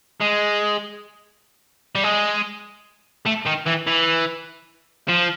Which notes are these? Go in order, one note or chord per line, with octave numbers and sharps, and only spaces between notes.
G#3
G3
G#3
A3
D#3
E3
E3
F3